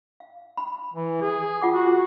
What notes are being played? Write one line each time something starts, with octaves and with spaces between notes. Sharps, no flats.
F5
B5
E3
G#4
F4 F#5 D6
F#4